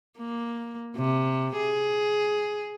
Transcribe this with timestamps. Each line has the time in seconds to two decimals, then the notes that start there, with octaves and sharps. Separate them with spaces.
0.18 A#3
0.96 C3
1.56 G#4